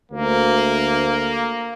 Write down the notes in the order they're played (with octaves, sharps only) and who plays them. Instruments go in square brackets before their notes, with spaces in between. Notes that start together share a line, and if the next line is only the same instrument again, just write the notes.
[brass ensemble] D2 [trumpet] A#3